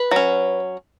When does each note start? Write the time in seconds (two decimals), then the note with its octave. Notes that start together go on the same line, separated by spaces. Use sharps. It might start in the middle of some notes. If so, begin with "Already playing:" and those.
Already playing: B4
0.11 F#3 C#4